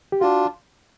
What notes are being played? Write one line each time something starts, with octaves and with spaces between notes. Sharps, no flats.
G4
D4 F4 F#4